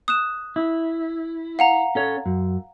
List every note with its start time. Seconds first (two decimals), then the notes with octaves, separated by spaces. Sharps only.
0.08 D#6 F#6 E7
0.56 E4
1.59 F5 F#5 A#5
1.95 C#4 A4 C#5
2.26 F#2